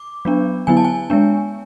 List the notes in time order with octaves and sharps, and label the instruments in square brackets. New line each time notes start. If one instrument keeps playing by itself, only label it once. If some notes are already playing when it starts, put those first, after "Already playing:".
Already playing: [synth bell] D6
F#3 B3 D4
D3 F#3 B3 E4 G#5
A5
G#5
G#3 B3 D4